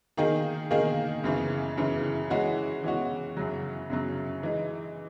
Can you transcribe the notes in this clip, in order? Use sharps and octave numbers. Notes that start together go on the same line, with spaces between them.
D#3 A#3 D#4 G#4
D#3 A#3 D#4 G#4
F#2 C#3 E3
F#2 C#3 E3
E3 G#3 C#4 F#4
E3 G#3 C#4 F#4
F#2 C#3 F#3
F#2 C#3 F#3
E3 G#3 D#4